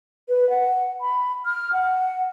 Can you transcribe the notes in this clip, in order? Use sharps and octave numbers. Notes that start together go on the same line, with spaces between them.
B4
F#5
B5
F6
F#5